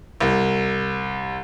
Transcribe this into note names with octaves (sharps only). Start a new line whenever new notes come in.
C2